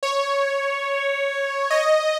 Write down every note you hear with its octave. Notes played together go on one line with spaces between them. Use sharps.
C#5
D#5